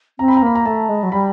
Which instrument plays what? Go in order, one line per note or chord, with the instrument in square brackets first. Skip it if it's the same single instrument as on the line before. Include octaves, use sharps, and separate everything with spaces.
[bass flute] C4 [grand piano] A#5
[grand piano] B5
A#5
[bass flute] A#3 [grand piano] B5
[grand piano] A#5
[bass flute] A3 [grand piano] A5
[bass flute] G#3
F#3
[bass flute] G3 [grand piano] B5